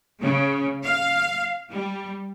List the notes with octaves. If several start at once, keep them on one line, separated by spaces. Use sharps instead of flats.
C#3
F5
G3